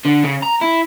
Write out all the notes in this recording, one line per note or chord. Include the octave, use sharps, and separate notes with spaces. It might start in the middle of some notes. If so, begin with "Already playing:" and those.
D3
C#3
A#5
E4